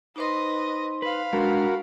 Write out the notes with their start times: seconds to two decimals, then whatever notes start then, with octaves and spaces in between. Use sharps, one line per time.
0.16 D#4 B4 C5 D#5 C6
1.02 B4 F5 B5
1.33 G#3 D4 F#4 A#4